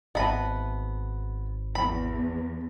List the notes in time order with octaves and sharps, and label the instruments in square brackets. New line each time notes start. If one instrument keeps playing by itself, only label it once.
[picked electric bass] G#1 [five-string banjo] B3 B5 [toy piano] D#5 E5 A5
[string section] E2 [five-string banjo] B5